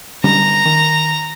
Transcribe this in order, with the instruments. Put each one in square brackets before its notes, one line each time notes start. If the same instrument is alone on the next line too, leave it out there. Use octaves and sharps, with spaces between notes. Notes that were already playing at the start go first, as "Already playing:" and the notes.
[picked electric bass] D3 G3 C#4 [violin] A#5
[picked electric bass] D#3